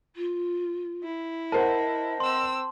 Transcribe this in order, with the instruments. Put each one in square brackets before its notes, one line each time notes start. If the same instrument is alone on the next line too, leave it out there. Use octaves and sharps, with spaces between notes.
[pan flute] F4
[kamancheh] E4
[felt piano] A#4 C5 F#5 [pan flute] D#5 [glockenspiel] A5
[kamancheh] C4 E6 [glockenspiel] C6